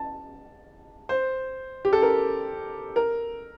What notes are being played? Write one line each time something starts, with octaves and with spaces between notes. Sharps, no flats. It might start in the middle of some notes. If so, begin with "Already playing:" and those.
Already playing: A5
C5
G4
A4
A#4
A#4